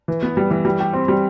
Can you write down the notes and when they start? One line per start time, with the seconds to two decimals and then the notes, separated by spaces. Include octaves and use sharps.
0.08 E3
0.22 B3
0.37 G3
0.51 E3
0.65 G3
0.80 G4
0.93 C4
1.08 G3